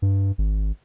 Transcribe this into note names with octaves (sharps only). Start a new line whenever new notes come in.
G2
G#1